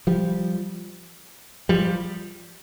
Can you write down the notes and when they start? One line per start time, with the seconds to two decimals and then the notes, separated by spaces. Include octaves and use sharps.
0.07 F3 G3
1.69 F3 G3